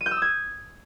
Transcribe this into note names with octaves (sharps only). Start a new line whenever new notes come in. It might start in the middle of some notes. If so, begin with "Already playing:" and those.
D#7
G6
E6
D#6
G#6